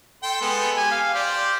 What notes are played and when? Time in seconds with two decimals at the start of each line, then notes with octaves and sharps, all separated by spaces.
0.23 A4 G5 C6
0.41 G#3 B3 A4
0.77 G4 G#5
0.91 F5
1.14 G4 C5 D5